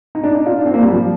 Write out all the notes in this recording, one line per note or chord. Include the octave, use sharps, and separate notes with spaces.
D#4
D4
D#4
F4
D4
C4
A#3
G3
F3